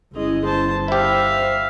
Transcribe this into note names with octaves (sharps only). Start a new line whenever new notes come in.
G1 G#3 C#4 E4 D#5
C5 A5
E4 G4 C5 E5 F5